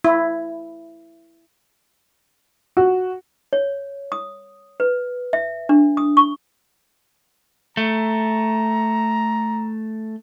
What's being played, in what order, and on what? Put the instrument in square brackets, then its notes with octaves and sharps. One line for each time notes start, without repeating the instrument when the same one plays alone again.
[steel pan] E4
[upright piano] F#4
[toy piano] C#5
D#6
B4
E5
D4
D#6
C#6
[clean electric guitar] A3 [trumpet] A#5